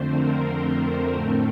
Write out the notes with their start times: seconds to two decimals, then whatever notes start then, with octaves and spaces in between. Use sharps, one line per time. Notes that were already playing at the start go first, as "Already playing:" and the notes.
Already playing: F2 D3 A3 C4 C5
0.09 A#4
1.11 A2 A3 C4